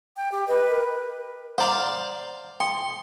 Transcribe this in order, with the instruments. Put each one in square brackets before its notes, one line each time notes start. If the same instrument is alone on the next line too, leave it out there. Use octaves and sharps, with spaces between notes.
[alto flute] G5
G4
[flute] B4 [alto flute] D#5
[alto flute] A#4
[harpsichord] C5 D5 F5 [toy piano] F#5 A#5
[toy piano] G5 [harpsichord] C6